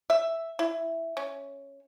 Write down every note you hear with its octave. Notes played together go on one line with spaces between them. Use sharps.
E5
E4
C#4